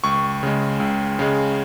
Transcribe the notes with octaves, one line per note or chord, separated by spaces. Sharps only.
C#2 C#6
C#3 G#3
C#2
C#3 G#3